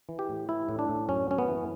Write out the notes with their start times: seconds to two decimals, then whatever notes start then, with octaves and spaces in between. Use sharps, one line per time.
0.09 E3
0.19 G4
0.29 A2
0.49 E3 E4
0.69 A2
0.79 D4
0.89 A2
1.08 F#2 C#4
1.28 F#2 C#4
1.38 B3
1.48 E3